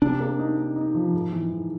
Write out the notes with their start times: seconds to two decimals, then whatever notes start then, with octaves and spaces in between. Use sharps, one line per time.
0.02 C3 D4
0.20 A#3
0.39 D#4
0.57 D#4
0.76 D#4
0.95 F3
1.13 G#2
1.32 E3
1.51 G#2